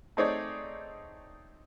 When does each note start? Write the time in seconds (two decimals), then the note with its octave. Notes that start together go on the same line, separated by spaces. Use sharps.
0.17 A3 C4 D#4 G#4 C#5 D5